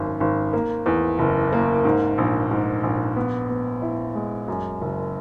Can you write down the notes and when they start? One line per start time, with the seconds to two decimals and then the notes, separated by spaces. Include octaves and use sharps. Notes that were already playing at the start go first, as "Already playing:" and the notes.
Already playing: G#1 F#2
0.20 G#1
0.53 A#3
0.86 E2
1.19 F#1
1.52 A#3
1.85 G#2
2.18 A#1
2.51 G#2
2.83 A#1
3.16 B3
3.49 B3
3.82 E4
4.15 G#3
4.48 F#2
4.81 F#1